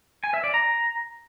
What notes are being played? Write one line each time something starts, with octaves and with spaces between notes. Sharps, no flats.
G#5
E5
D5
A#5